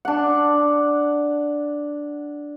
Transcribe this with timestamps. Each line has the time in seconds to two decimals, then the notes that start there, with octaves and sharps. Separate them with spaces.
0.05 D4 F#5